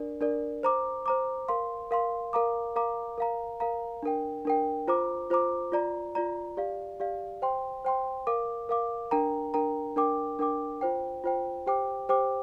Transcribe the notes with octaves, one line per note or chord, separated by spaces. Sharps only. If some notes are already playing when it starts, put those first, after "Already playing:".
Already playing: D4 A#4 D5
D4 A#4 D5
C5 A#5 D6
C5 A#5 D6
A#4 F5 C6
A#4 F5 C6
A#4 F5 A#5 D6
A#4 F5 A#5 D6
A#4 F5 A#5
A#4 F5 A#5
D4 A#4 G5
D4 A#4 G5
F4 C5 A#5 D6
F4 C5 A#5 D6
F4 D5 A#5
F4 D5 A#5
G4 D5 F5
G4 D5 F5
C5 G5 C6
C5 G5 C6
A#4 F5 D6
A#4 F5 D6
D4 A#4 G5 A#5
D4 A#4 G5 A#5
D4 A#4 G5 D6
D4 A#4 G5 D6
F4 C5 G5
F4 C5 G5
G4 C5 G5 D6
G4 C5 G5 D6